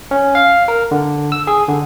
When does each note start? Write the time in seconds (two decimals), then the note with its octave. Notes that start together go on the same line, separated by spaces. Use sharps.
0.11 C#4
0.35 F5
0.68 A#4
0.91 D3
1.32 E6
1.47 G#4
1.68 D3